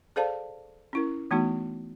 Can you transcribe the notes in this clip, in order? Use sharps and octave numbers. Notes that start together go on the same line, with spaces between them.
G#4 A4 C5 D5 F5 A5
C#4 E4 A#4
E3 A3 B3 D#4 F#4